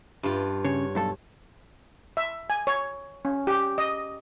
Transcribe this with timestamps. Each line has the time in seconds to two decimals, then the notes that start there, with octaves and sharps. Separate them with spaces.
0.23 G2 F4
0.65 C#3 C#5
0.95 B1 G2 A4
2.17 E5
2.50 G#5
2.67 C#5
3.25 C#4
3.47 G4
3.78 D#5